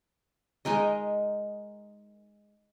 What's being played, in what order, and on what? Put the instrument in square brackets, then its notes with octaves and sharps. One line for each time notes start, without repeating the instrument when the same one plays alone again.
[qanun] G#3 D#4 A#4 D#5